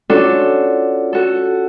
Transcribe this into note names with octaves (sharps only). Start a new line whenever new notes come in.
C#4 D4 F4 F#4 A4
F#4 A4